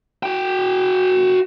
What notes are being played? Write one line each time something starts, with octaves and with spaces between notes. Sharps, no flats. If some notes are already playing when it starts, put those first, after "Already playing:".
F#4 G5